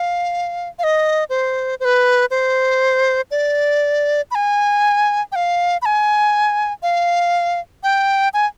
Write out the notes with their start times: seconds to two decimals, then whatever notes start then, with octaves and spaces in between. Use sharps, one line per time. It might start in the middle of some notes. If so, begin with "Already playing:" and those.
Already playing: F5
0.79 F5
0.84 D#5
1.30 C5
1.80 C5
1.85 B4
2.31 C5
3.31 D5
4.31 B5
4.35 G#5
5.32 G5
5.36 F5
5.82 B5
5.86 G#5
6.83 F5
7.83 G5
8.34 G#5